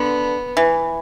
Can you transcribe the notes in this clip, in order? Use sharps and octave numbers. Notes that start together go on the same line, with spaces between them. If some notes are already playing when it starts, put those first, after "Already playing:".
Already playing: D3 B3
E3